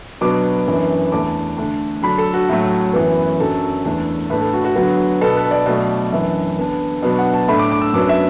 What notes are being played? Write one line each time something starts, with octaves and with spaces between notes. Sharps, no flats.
B2 F#3 B3 D4 D6
F#2 E3 B3 D4
E2 E3 A3 D4 D6
D3 A3 D4
D3 F#3 D4 B5
A4
F#4
A2 F#3 A3
F#2 E3 B3
F#2 F#3 D4 A4
E2 E3 A3 D4
A2 A3 D4 B4
A4
F#4
F#4
D3 F#3 B3 F#4
B2 B3 D4 A4
B4
D5
B2 F#3 A3
F#2 E3 D4 E5
D3 B3 D4
B2 F#3 B3 D4
F#5
A5
A2 A3 D4 B5
D6
D6
E6
F#2 F#3 B3 D4 D6
E5